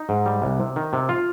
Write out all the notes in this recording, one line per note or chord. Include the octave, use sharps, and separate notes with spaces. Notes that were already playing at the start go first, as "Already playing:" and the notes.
Already playing: D#4
G#2
G3
C2
C3
D#3
C3
F4